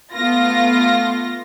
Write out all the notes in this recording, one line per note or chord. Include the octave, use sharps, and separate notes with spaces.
A3 B3 F4 A#6